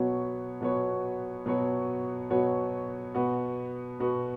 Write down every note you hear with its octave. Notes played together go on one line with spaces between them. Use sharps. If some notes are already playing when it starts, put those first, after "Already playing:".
Already playing: B2 F#3 B3 F#4 C#5
B2 F#3 B3 F#4 C#5
B2 F#3 B3 F#4 C#5
B2 F#3 B3 F#4 C#5
B2 B3 F#4
B2 B3 F#4